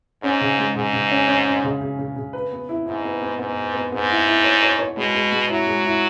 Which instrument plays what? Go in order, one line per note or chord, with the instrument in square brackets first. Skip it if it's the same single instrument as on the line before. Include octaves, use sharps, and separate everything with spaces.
[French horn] G#2 [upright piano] C#4
[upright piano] C#3
G#3
[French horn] G#2 [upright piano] C#3
[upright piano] C#3
C#4
C#4
C#4
C#3
C#3
C#3
C#3
B4
B3
E4
[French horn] G#2 [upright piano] E4
[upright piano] B3
B3
[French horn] G#2 [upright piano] B3
[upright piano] B3
B3
[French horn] G#2 [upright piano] B3
[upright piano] E4
E4
C#5
C#5
C#5
[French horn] B2 [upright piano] G#3
[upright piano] G#3
G#3
[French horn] F#3 [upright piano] E4
[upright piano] G#3
E4